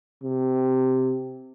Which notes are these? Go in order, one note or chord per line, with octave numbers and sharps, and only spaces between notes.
C3